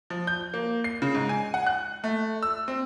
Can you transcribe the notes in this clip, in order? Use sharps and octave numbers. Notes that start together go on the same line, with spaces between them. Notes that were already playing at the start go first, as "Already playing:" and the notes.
F3
G6
A#3
C7
C#3
G#2
G#5
F#5
F#6
A3
E6
C4